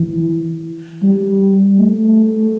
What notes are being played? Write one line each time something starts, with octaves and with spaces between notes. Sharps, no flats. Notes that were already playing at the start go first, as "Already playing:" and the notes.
Already playing: E3
G3
A3